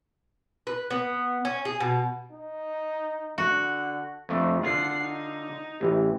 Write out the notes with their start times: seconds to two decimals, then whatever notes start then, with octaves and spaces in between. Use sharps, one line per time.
0.67 B4
0.91 B3
1.45 C#4
1.65 G#4
1.80 B2
2.33 D#4
3.38 D3 F#4
4.29 F2 A3 D4
4.63 D3 F4 F#5 C7
5.03 D#4
5.81 A1 E3 G4